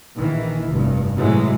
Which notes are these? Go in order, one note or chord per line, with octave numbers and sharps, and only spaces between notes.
A#1 D#3 E3
F1 G2
A2 C3 E3 F#3 G#3